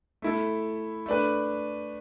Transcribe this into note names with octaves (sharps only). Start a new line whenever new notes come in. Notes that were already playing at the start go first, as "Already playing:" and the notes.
A3 E4 A4
A3 D4 B4